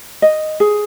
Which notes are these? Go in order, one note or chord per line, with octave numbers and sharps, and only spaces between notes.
D#5
G#4